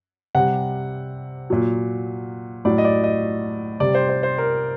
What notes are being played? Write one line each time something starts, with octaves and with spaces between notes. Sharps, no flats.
C3 G3 F#5
A#2 F#3
A2 F#3 D5
D#5
D5
D#5
C3 G3 D5
C5
C5
C5
A#4